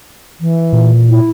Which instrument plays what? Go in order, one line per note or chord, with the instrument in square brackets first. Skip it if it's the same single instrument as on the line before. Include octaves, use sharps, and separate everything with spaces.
[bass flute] E3
[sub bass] A#2
[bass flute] E4